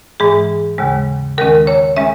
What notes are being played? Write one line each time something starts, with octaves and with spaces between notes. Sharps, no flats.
G#2 E3 G#3 G#4
D#2 C#3 G#3
D#2 D#3 G#3 C#4 A#4
C#5
G#3 C#4 E5